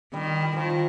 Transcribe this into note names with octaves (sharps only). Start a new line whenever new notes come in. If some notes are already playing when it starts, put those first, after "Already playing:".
D#3 G3
G3
D#3 F3